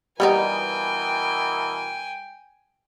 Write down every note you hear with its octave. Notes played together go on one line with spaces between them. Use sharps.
B2 E3 G3 B3 D#4 A#4 G5 G#5